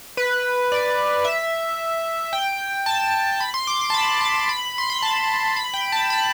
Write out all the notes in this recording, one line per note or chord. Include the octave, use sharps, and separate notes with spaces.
B4
D5
E5
G5
A5
B5
C6
D6
D6
A5
B5
A5
B5
C6
B5
A5
B5
G5
A5
B5